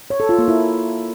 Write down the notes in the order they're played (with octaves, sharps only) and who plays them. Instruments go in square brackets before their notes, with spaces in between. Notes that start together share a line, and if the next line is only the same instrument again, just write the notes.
[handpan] C#5
A4
F4
A#3
E4